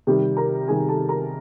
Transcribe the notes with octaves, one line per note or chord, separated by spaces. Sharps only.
C3 D#3 G3
A#4 A#5
C3 D#3 G3 G#4 G#5
A4 A5
A#4 A#5